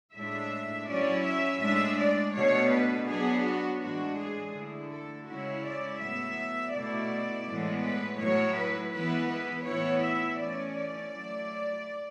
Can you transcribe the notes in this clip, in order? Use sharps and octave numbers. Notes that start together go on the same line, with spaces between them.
A2 G#3 D4 E5
F#3 C#4 E4 D5
E5
A2 G#3 D4 E5
D5
B2 A3 D4 C#5
B4
F#3 B3 D4 G#4
F#4
A2 E3 G#3 D4 F#4
G#4
D3 A3 E4
A4
C#3 G#3 C#4 E4 F#4
D5
A2 F#3 B3 E5
B2 A3 E4 D5
A2 E3 G#3 B3
B4
A2 F#3 A3 E4 C#5
B4
E3 G#3 B3 E4 B4
B4
A2 E3 B3 E4 C#5
E5
E3 A3 C#4 D5
D5
F#3 A3 E4